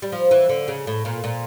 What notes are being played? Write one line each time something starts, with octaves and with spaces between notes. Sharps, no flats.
G3
F3
E3
D3
C#3
A2
A#2
A#2